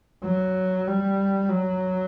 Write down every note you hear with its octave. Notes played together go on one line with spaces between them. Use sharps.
F#3
G3
F#3